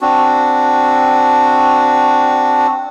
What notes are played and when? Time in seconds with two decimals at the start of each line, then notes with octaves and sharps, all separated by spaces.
0.01 C4 D4 F#4